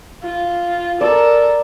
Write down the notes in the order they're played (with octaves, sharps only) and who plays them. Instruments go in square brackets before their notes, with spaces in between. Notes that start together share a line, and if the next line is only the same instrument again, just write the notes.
[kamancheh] F4
[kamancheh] A4 A#4 [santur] D5